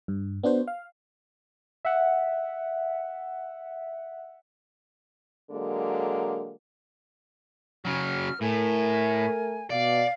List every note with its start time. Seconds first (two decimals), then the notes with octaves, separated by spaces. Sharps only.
0.08 G2
0.43 B3 D4 F#4 C5
0.67 F5
1.85 E5 F#5
5.51 D3 F#3 G#3 A#3
7.85 C#3 F#3 F6
8.41 A2 A3 A#4 G#5
9.70 B2 D5 F5